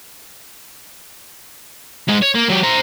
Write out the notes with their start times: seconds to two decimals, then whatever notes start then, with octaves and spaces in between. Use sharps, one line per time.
2.08 G#2 G#3
2.22 C#5
2.35 A#3
2.49 F#3 G4
2.63 C5 A#5